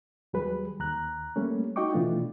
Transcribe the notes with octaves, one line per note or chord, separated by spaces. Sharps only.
D#2 F#3 G3 G#4 B4
D#2 A#5 F#6
G3 A3 A#3 C#4
D#4 F#4 D#5 G5 C#6 D6
B2 E3 A3 D4 F4